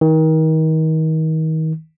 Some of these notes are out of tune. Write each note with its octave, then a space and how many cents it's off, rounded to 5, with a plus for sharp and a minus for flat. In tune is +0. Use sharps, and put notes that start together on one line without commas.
D#3 +30